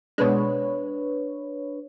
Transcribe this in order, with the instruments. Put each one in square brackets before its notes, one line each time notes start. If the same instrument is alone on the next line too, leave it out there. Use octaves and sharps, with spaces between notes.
[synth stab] B2 G#3 [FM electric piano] D4 B4 C#5